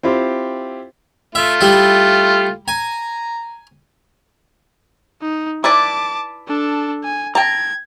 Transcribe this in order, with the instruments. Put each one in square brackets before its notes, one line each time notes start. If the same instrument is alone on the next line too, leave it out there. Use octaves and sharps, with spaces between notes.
[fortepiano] C4 E4 F4 G4
[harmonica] A3 F4 [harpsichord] E5
[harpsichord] G3 E4
[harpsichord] G#5 [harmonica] A#5
[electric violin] D#4
[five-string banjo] E4 B4 D5 [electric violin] A5 D6
[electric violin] D4 A4
G#5
[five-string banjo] G5 A5 A#5 [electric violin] G#6